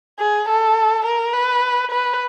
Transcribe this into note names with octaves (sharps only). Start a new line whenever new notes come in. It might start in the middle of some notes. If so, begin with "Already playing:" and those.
G#4
A4
A#4
B4
B4